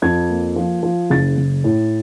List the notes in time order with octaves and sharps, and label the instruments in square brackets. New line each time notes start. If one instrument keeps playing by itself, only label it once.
[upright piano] F2 G#6
A#3
F3
F3
F#1 A6
F#1
A2